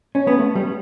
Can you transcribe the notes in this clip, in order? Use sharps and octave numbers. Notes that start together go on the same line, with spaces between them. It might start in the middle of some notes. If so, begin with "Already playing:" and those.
C#4
B3
A3
G3